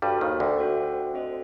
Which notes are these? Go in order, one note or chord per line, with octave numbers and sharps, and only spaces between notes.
G2 G3 F#4 A4 C5 G5
D#2 D#3
D2 D3
F#4 A4 C5 G5
C4 F#4 A4 C5 D#5